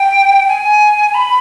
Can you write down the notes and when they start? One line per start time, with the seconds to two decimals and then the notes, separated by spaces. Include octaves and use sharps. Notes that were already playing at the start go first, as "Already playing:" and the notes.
Already playing: G5
0.48 G#5
1.14 B5